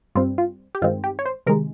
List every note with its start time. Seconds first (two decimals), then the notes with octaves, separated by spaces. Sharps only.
0.15 G2 G3 C4 F4
0.38 F4
0.75 G4
0.82 G2 D#3 G#3 C4 F4
1.04 G4
1.19 C#5
1.26 C5
1.46 C3 D#3 G#3 A#4